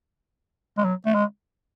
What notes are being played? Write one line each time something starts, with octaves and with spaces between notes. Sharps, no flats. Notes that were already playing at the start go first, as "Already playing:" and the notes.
G#3
F#3
A3
G#3